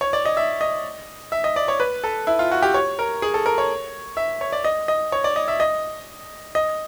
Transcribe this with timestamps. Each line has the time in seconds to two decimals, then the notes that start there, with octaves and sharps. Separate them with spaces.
0.01 C#5
0.13 D5
0.25 D#5
0.37 E5
0.61 D#5
1.32 E5
1.44 D#5
1.56 D5
1.68 C#5
1.80 B4
2.04 A4
2.27 E4
2.39 F4
2.51 F#4
2.62 G4
2.74 C#5
2.99 A#4
3.22 G#4
3.34 A4
3.46 A#4
3.58 C#5
4.17 E5
4.41 C#5
4.52 D5
4.64 D#5
4.88 D#5
5.12 C#5
5.24 D5
5.36 D#5
5.48 E5
5.60 D#5
6.55 D#5